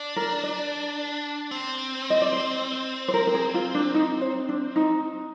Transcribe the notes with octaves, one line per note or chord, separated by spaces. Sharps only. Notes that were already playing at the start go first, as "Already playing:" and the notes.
Already playing: D4
A#4
D5
C4
D#5
D5
C5
C5
A#4
A#4
G#4
F4
D4
D#4
C5
D4
D#4